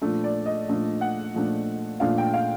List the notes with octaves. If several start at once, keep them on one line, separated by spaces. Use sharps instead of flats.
A#2 F3 A3 D4
D5
D#5
A#2 F3 A3 D4
F#5
A#2 F3 A3 D4
A#2 F3 A3 D4 F5
G5
F5